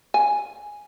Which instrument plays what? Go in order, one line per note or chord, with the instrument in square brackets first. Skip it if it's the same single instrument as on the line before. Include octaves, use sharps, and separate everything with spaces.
[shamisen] G#5